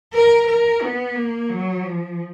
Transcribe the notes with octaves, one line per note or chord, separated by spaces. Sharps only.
A#4
A#4
B3
A#3
F#3
F3